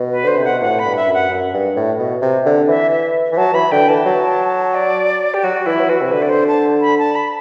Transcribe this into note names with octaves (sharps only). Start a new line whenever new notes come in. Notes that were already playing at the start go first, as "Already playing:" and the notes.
Already playing: B2
B4
D3 C5
C3
F#5
B2
A2 F#5
B5
G2
E5
F#2
F#5
F#2
G2
A2
B2
C3
D3
E3 E5
E5
E3
F#3 A5
E3 B5
D3 G5
E3 A5
F#3
D5
G4
F#3 F#4
E3 E4
F#3
E3 F#4
C3
D3 B4
D5
C5
A5
B5
A5
B5